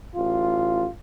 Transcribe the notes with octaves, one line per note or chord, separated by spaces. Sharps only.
A1 F4